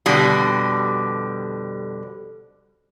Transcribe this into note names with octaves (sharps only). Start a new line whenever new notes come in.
F2 B2 D3 G3